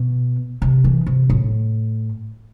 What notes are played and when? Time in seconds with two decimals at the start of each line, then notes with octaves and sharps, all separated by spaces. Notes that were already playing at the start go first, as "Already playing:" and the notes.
Already playing: B2
0.62 C3
0.84 E3
1.06 C3
1.30 A2